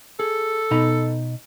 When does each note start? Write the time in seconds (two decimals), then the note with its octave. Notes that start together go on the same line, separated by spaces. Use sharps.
0.20 G#4 A4
0.71 B2 D#4 B5